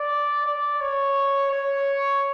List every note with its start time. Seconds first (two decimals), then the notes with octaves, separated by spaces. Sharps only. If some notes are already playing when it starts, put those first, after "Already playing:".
Already playing: D5
0.46 D5
0.80 C#5
1.51 C#5